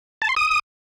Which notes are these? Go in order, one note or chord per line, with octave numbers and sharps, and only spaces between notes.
A5
C6
D#6